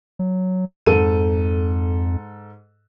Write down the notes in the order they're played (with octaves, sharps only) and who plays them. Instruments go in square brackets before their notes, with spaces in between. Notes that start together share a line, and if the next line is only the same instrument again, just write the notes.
[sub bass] F#3
[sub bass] F2 [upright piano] G#2 A4 D#7